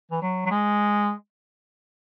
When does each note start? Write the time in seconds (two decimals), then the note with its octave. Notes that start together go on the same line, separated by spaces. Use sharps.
0.11 E3
0.22 F#3
0.46 F#3
0.50 G#3